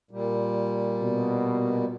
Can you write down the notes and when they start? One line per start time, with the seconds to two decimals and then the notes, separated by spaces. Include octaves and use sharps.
0.11 A#2 G3
1.00 B2